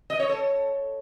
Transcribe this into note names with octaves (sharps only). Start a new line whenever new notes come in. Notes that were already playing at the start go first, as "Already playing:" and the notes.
D#5
C#5
A4